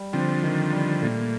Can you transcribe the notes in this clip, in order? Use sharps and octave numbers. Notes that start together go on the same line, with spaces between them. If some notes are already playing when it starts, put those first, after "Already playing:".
Already playing: G3
D3 F3 C4
D#3
G3
A#2 A3